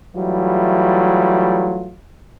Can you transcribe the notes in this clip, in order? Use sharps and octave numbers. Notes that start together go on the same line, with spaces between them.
E3 F#3 G3 A3 F4